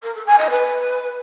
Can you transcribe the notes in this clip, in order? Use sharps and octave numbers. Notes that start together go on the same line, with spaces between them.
A#4
A4
G#5
D#5
B4